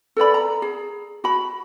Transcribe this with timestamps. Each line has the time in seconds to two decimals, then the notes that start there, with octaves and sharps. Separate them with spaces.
0.16 A4 B4 D5 B5
0.34 A#5
0.62 G#4
1.24 F#4 B5